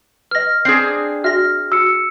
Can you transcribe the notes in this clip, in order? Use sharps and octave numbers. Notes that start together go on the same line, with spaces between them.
B4 D#5 F6 A#6
C4 D4 G#4 C7
F#4 E5 F6 A#6
F#4 E6 C#7